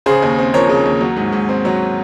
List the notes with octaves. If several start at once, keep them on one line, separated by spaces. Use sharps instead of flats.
C#3 G#4 C5
D#2
C4
F3 A#4 C#5
C#3
D#2
F#3
G#2
G#2
C4
F#3